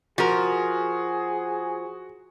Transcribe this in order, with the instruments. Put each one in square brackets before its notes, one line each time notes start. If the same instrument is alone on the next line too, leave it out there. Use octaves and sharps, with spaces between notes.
[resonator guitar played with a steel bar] F3 A#4 [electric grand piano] F#4 [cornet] G#4